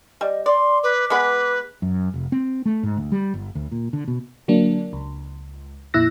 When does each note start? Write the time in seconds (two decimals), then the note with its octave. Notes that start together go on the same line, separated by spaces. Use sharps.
0.21 G3 D#5
0.46 D5 C6
0.83 B4 D6
1.10 G#3 B3 B4 B5
1.82 F#2
2.14 F1
2.32 C4
2.66 A3
2.83 G#2
2.97 D2
3.12 G3
3.34 G1
3.55 D2
3.72 A#2
3.93 D3
4.08 B2
4.48 D3 F#3 A#3 D4
4.93 C#2
5.94 F2 A#2 E4 E6 F#6 A#6